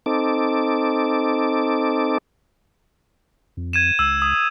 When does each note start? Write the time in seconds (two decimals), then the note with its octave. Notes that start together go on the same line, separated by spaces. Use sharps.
0.06 C4 D#4 A4 D6
3.57 F2
3.73 G#6 D#7 E7
3.99 C#2 E6
4.22 D#6